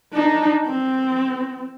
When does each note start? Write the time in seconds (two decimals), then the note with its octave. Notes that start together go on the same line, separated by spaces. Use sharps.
0.13 D4 D#4
0.66 C4